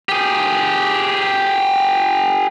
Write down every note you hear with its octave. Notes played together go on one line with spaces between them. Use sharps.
G4 G#4